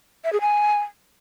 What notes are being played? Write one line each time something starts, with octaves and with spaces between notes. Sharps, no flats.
E5
G#4
G#5